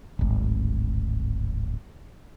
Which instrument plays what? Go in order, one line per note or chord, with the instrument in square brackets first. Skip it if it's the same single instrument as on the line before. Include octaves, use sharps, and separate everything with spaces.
[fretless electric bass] D1 G#1